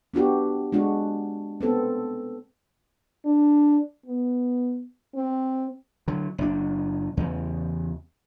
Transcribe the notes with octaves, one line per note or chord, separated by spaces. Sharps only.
B3 D4 F#4 G4
G#3 D4 F#4
B3 C4 A4
D4
B3
C4
D3 F#3
F#1 D4
E2 C#3